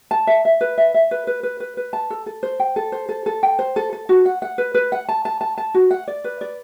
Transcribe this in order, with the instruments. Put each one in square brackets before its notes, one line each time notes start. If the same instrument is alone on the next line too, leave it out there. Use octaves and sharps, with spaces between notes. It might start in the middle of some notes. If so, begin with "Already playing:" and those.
[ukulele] A5
E5
E5
B4
E5
E5
B4
B4
B4
B4
B4
A5
A4
A4
C5
G5
A4
C5
A4
A4
G5
C5
A4
A4
F#4
F#5
F#5
B4
B4
F#5
A5
A5
A5
A5
F#4
F#5
D5
B4
D5